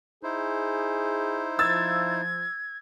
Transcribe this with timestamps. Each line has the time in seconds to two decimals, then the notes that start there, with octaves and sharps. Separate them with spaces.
0.23 D#4 E4 G#4 C5
1.59 F3 E6 G#6 A6